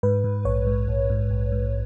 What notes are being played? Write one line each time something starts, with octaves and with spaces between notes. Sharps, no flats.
G#2 B4
G#2
A#1 C#5
G#2
A#1
G#2
A#1
G#2